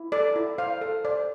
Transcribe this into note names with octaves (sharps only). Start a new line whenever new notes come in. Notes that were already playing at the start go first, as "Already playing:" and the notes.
Already playing: E4
A4 D5
E4
C5 F5
A4
C5 D5